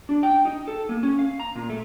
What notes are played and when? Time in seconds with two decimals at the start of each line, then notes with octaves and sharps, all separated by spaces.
0.09 D4
0.23 G5
0.45 D#4
0.68 A4
0.89 A#3
1.03 C#4
1.19 F5
1.40 A#5
1.56 A#2
1.69 A3